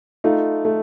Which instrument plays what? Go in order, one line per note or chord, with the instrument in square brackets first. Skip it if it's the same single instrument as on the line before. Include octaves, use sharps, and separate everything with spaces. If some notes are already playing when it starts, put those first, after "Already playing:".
[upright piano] A3 D#4 F4
A3